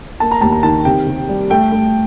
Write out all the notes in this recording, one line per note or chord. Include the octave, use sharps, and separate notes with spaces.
A#3 A5
A#5
D#2 A5
A#5
D#3 A5
C3 G5
C3
G3
A3 G5
A3